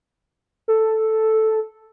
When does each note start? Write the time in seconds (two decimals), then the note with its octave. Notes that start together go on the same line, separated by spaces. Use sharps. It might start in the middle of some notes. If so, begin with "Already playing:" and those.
0.68 A4